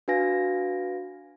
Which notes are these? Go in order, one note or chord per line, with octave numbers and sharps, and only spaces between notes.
D4 F#4 B4 F5 G#5 A#6